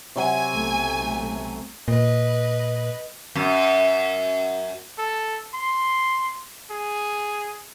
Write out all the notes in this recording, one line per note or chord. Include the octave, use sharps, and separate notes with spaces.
C3 F#3 G#5
B1 A3
A#2 B4 D#5
F#2
A4
C6
G#4